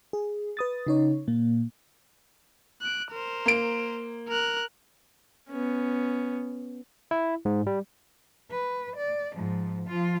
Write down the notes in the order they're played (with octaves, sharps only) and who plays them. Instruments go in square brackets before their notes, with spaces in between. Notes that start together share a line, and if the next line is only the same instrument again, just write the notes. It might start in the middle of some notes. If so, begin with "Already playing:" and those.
[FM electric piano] G#4
B4 D#6 A6
C#3 D#4 C#5
A#2 A#3
[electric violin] F#6 D7
A#4 C5
[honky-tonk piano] A#3 D7
[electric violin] A#4 F#6
[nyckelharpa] B3 C#4
[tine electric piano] E4
G#2
G3
[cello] B4
D5
G#2 F3
F3 F4